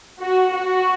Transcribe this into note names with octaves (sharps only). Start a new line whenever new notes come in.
F#4
F#4